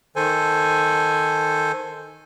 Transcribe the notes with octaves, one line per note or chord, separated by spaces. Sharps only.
D#3 A4 C5 G#5